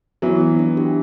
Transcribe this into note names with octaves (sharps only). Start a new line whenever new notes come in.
E3 F#3 B3
B3
D4
G4